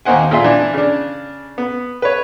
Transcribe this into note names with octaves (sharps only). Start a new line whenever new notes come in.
D#2 A#3 D#4 C5 F#5 G#5
A#2 F4 G#4 E5 C6
E3 D4
C#3 D4
B3
B4 C#5